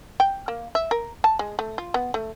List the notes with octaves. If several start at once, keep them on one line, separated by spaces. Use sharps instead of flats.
G5
A#3
E5
A#4
A5
G#3
A3
F4
B3
A3